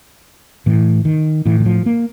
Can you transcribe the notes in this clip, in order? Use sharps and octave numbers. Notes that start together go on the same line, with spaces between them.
A2 E3
D#3
A2 E3
E3
F3
A#3